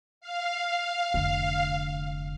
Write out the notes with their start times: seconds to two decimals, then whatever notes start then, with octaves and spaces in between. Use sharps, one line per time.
0.21 F5
1.14 F1 D3